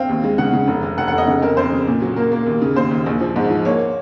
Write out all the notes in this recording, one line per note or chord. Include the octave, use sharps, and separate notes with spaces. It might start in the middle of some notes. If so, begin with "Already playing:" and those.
Already playing: C4 F5
D#2
G#3
C#3 F#5
C#3
F1
F1
F1 F#5
F#5
F1
D#5
C#3
F2 A#4
F2 C5
C#3
A#2
F#3
A#3 A#4
A#3
D#2
C#3
D#2 C5
D#2
A#1
F3
G#2
F3
A#3 C#5